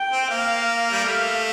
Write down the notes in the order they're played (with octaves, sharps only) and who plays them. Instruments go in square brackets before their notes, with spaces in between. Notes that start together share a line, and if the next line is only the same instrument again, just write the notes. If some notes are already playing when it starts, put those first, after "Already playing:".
Already playing: [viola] G5
[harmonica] C4
[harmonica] A#3 [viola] F5
[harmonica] G3
[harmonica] A3 [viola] F5